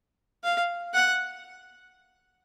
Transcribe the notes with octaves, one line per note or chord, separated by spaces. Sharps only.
F5
F#5